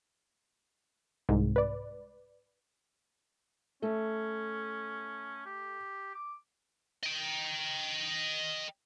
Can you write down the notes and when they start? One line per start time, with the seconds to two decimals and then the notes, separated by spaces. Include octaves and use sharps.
1.29 C2 G#2
1.56 B4 D5
3.82 A3 C#4
5.46 G4
6.15 D6
7.03 D#5 G5